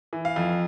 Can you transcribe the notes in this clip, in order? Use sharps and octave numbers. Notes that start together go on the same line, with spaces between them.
E3
F5
F2